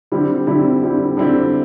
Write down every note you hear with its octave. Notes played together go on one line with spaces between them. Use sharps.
D3 G3 C4 E4
D3 G3 C4 E4
D3 G3 C4 E4
D3 G3 C4 E4